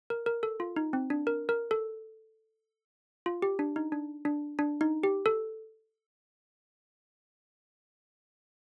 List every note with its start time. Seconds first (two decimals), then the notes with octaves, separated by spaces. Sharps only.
0.10 A#4
0.26 A#4
0.43 A4
0.60 F4
0.76 D#4
0.93 C4
1.10 D4
1.27 A#4
1.49 A#4
1.71 A4
3.26 F4
3.42 G4
3.59 D4
3.76 D#4
3.92 D4
4.25 D4
4.59 D4
4.81 D#4
5.04 G4
5.26 A4